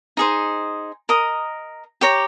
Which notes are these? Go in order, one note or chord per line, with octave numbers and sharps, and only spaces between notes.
D#4 G#4 C5
A#4 D#5 A#5 D#6
G4 C#5 G5 A#5